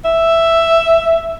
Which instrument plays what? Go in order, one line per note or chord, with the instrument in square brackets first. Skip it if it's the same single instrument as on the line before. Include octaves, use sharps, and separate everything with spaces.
[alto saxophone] E5